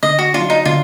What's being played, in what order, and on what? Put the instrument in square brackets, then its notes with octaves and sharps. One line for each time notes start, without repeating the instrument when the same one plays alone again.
[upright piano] D3 [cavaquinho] D#5
[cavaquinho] F#4
[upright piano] F#3 D4 [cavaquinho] F4
[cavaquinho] D#4
[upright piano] D3 [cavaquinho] F4